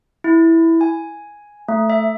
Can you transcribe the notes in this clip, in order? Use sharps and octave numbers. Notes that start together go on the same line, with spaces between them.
E4
G#5
A3
E5